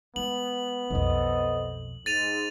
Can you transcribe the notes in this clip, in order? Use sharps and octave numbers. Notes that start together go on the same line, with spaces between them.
G#3 B3 F#7
B1 F2 A4 C5 D#5
G#2 A6 D#7 F7